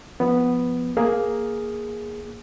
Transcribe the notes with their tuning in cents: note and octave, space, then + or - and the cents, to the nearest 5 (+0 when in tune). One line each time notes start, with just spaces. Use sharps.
F3 +0 B3 +0
A#3 +5 G#4 +0